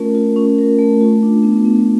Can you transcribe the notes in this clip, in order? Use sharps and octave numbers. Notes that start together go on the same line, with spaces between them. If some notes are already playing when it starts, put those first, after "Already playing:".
Already playing: A3 C#4 F4 A#4
F4
C#4
A#4
A3
F4
D4
B3
B3